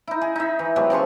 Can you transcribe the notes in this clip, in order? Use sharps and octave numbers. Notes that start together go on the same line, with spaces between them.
D#4 E4
G#4
D#4 E5
E3
F#3 G#3 B3 G4
C#3 F3 C6 C#6